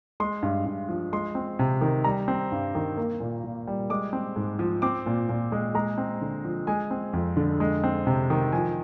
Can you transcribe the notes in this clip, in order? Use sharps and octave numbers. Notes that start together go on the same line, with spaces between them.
G#3 C6
G2
G2
F3
G#3 C6
C4
C3
D#3
G3 A#5
C4
G2
D#3
A#3
A#2
A#2
G3
G#3 D6
C4
G#2
F3
C4 D6
A#2
A#2
G#3
G#3 A#5
C4
D3
F3
G#3 G#5
C4
F2
D3
G#3
C4
C3
D#3
F3 G#5